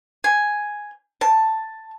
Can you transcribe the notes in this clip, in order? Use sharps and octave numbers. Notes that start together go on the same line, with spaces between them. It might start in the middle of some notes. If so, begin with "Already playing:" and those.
G#5
A5